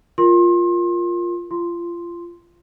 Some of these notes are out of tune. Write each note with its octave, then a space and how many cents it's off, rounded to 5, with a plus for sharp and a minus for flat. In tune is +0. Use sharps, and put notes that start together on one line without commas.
F4 +0 A#4 +0 C6 +30
F4 -25 C6 +0